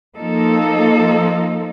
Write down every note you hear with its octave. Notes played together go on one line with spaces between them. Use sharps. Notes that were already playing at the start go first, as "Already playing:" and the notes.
F3 A#3 D#4 A4